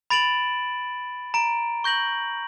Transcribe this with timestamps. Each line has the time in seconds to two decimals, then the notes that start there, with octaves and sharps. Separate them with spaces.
0.10 B5 A6 D7 E7 F#7
1.34 A#5 D7
1.84 C#6 G6 A#6 F#7